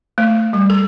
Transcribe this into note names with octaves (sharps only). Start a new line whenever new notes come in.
A3
G3
A4